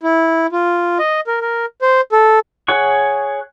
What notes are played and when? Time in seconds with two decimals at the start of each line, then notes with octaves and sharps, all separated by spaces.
0.03 E4
0.52 F4
0.99 D#5
1.27 A#4
1.41 A#4
1.82 C5
2.12 A4
2.68 G#4 C#5 F#5 C#6